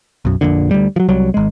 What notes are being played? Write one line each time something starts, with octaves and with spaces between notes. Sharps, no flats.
B1 F#2
A#1 F2 A#2 D3
D2 G3
F3 F#3
C2 F#3 G3
G#1 G#3